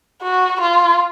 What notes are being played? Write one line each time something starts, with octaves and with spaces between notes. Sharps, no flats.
F#4
F4